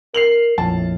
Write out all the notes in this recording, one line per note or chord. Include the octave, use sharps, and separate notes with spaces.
A#4 C7 F7 F#7
A#1 F2 A2 A5